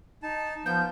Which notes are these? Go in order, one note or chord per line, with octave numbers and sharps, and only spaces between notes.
D#4 A5
F3 B3 G6